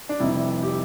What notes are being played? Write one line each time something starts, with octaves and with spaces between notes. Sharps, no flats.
D4
F1 F2 C3 G3 E4
G4